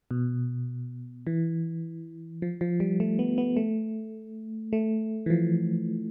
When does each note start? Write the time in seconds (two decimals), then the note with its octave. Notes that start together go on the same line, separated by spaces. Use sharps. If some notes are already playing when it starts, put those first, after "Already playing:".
0.11 B2
1.27 E3
2.42 F3
2.61 F3
2.80 G3
3.00 A3
3.19 B3
3.38 B3
3.57 A3
4.73 A3
5.26 E3
5.30 F3